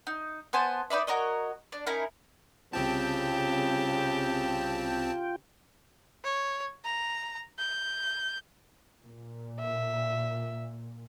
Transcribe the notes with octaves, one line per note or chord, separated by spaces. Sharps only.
D#4
B3 C5 G#5 A5
D#4 B4 D5 E5
F#4 A#4 C#5 D#5
D4
C#4 D#4 E4 A#4
C2 C#3 C4 F4 G4 G5 A5
C#5
A#5
G6
A#2
E5